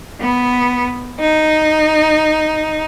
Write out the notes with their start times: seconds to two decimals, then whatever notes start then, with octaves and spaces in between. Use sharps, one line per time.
0.21 B3
1.20 D#4